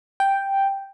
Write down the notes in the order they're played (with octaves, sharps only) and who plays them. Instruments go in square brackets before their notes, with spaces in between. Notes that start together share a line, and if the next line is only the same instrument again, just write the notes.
[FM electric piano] G5